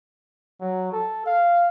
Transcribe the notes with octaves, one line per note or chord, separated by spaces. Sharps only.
F#3
A4
F5